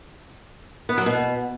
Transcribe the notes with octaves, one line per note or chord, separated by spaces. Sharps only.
B3
F#3
B2